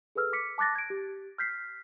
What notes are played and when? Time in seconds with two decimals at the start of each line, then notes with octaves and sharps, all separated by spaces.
0.15 G#4 A4 B4 E6 F6
0.33 D6 B6 C#7
0.58 A5 D6 F#6 A6 A#6
0.75 G#6 D7
0.90 G4
1.38 F6 G6 B6 C7